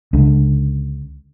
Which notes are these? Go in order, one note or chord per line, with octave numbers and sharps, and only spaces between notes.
C#2 D3